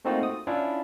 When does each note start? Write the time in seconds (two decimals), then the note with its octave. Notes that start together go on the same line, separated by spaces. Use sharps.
0.05 A3 A#3 C4 D#4 F4 F#4
0.23 D#6
0.47 C#4 D4 E4 F4